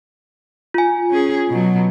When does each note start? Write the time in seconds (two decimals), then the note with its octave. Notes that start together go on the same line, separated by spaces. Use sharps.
0.74 F4 G#5
1.10 C#4 G#4
1.49 B2 F#3